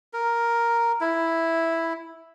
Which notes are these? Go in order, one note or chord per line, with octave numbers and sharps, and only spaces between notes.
A#4
E4